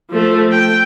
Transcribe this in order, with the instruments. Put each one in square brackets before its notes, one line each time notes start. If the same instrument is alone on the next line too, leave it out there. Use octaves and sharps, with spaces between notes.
[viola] F3 A3
G5